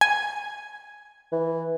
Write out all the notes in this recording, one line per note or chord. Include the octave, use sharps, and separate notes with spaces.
G#5
E3